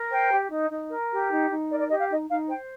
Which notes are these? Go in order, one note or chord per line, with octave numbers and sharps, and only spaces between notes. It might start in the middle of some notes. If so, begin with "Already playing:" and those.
Already playing: A#4
C5 G5
G4
D#4
D#4
A#4
G4
D#4
D#4
A#4 D5
D5
G4 D#5
F5
D#4 D#5
D#4 F5
C5 G5